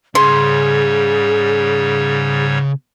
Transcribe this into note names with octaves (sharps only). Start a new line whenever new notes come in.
G#2 C#3 G3 G#4 C#5 C6